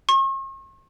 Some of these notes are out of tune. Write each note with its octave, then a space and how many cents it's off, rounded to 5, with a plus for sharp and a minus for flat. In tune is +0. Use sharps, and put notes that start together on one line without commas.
C#6 -45